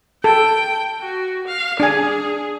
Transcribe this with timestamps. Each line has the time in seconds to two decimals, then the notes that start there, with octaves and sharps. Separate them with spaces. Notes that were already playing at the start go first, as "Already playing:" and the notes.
0.24 A4 G5
1.01 F#4
1.47 F5
1.80 D4 G#4 G#5